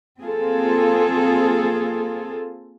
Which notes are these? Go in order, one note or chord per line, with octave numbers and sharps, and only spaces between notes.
A#3 C4 F4 G#4 A4